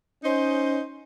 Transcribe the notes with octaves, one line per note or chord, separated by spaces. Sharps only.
C#4 D#4 C5 D#5